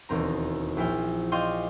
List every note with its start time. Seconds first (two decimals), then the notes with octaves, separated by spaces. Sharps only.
0.09 E1 D#2 C4 A#5
0.77 A#1 E4 F5 G5
1.32 D5 D#5 F5 G5 C6 C#6